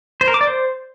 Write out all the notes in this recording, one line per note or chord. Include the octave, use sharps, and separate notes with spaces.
C5
A#4
D6
D5
C5